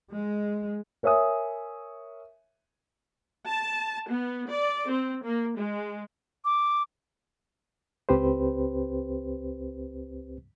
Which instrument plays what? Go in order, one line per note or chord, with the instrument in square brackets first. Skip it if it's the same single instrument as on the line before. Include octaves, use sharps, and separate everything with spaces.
[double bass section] G#3
[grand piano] A#4 C#5 E5 G#5 D#6
[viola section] A5
B3
D5
C4
A#3
G#3
[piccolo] D6
[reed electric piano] C#2 C4 G4 B4 C5